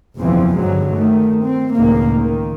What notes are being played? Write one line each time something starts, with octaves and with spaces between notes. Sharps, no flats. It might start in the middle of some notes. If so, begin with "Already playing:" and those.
F#1 B1 E2 E3 F3 C4
G2 D3 F#3 G#3
D#3 A3
C4
C#2 A2 D#3 A#3
D#3